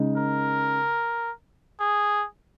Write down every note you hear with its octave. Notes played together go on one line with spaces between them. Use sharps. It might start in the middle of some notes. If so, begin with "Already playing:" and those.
Already playing: C#3 G#3 D#4
A#4
G#4